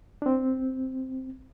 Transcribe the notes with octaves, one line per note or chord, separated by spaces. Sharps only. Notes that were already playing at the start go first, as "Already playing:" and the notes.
D4
C4